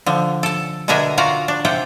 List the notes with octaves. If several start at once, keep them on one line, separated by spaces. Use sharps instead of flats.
D3 F3
A4 A5
B2 D3 D4 A#4 E5 G#5
F4 F#4 D5 A#5
D4
C3 F4 F#5 G5